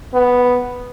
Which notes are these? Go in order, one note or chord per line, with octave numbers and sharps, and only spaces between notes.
B3